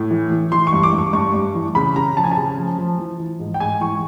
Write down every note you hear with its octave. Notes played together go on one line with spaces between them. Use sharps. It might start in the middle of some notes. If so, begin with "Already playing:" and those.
Already playing: A2
E3
E3
E3 C6
C#6
G2
D6
G2
C#6
G2 C#6
G2
E3
C#3 B5
C#3 A#5
F3 A5
G#5
A5
C#3
F3
F3
E3
E3
G#2
G5
G#2 G#5
E3 C#6